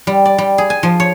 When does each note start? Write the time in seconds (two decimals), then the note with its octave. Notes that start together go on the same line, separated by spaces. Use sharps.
0.07 G3
0.25 D5
0.38 G3
0.58 G#4
0.70 G#5
0.83 F3
1.00 C#5